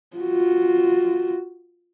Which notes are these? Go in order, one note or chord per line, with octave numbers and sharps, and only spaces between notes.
F4 F#4